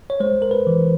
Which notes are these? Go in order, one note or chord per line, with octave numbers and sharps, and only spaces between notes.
C#5
G#3 C5
A#4
B4
E3